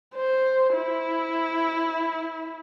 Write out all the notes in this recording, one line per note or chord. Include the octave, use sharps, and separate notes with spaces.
C5
E4